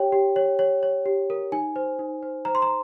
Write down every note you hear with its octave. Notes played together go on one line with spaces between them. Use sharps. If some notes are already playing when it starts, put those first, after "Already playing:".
Already playing: G4 C#5 G5
G4
C#5
C#5
C#5
G4
A#4
D#4 G#5
C5
D#4
C5
C5 A#5
C6
A#5